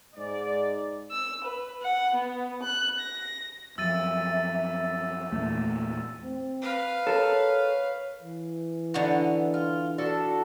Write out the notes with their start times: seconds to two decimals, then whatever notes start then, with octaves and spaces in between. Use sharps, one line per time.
0.15 G#2 D5
1.11 E6
1.45 B4
1.83 F#5
2.15 B3
2.63 F#6
3.00 A#6
3.78 F#2 F3 E5 E6 A6 D#7
5.32 E2 A#2 A3
6.24 C4
6.62 B4 F5
7.07 A4 A#4 C#5
8.23 E3
8.94 D3 B3 D#4 E4 F#4
9.54 F4
9.98 D4 F#4 A4